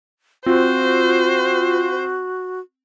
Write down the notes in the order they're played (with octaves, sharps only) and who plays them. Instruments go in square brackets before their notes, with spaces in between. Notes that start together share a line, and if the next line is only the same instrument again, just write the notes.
[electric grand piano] C4 [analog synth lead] F4 [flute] F#4 [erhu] C5